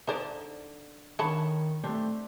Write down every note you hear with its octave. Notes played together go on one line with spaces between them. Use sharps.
D3 D#4 C5 D5
D3 D#3 C#5 A5 B5
A3 C4 D4 G4